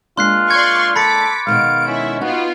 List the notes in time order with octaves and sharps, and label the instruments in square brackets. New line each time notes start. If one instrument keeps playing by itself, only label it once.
[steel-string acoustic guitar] G#3 A#3 D4 [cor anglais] F4 [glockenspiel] C6 F#6 C7
[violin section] D5 C6 C#6 [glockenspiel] G#6
[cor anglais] A4 [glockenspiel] B5 A6 C#7 [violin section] D6 B6
[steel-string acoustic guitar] B2 D#3 G#3 [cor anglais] F5 [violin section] D7
[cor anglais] C#4 [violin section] E4 E5
[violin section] B3 F4 [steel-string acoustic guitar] D#4 [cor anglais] F#4